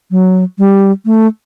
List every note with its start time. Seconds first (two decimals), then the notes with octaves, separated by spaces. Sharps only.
0.11 F#3
0.58 G3
1.05 A3